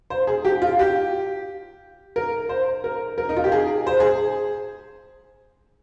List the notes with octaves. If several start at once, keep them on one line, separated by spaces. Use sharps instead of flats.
C5
G#4
G4
F4
G4
A#4
C5
A#4
A#4
D#4
F4
G4
G#4
C5
G#4